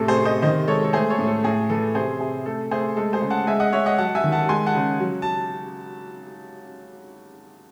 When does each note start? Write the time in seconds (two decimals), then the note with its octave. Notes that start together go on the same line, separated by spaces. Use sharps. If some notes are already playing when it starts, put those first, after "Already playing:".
Already playing: A2 C3 A4
0.08 G#4 C5
0.17 C3
0.25 C5 D#5
0.42 D#3 C5 D#5
0.67 G#3 A4 C#5
0.84 A4
0.93 A3 G#4 C5
1.10 A4 C#5
1.19 A2
1.27 A4
1.44 A2 G#4
1.70 E3 A4
1.94 C3 G#4 C5
2.20 C3 G#4
2.45 A3 A4
2.71 A3 G#4 C5
2.97 G#3 A4
3.13 G#4 C5
3.22 C#3
3.30 F#5 A5
3.47 G#3 E5 G#5
3.60 D#5 F#5
3.73 G#3 C#5 E5
3.86 D#5 F#5
3.98 F#3 F#5 A5
4.15 E5 G#5
4.24 D#3
4.32 F#5 A5
4.49 G#3 G#5 C6
4.66 F#5 A5
4.75 C#3
5.00 F#3
5.22 A5